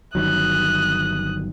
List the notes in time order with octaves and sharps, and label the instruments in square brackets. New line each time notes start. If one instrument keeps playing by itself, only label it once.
[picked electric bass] G1 D#3 F#3 [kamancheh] D#6 F#6